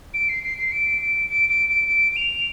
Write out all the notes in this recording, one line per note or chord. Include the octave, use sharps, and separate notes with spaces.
D7
C7
C7
C7
D7
D7
D7
D7
D7
D7
D7
F7